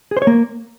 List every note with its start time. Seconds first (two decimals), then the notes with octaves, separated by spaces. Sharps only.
0.11 G#4
0.17 C5
0.22 C#5
0.27 A#3